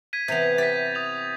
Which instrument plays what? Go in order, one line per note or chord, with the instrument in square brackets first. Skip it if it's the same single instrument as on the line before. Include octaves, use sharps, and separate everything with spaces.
[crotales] G#6 B6 D#7
[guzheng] C3 E3 B3 [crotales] G6 B6 F7
[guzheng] G4 [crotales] A6 B6
[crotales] D#6 F7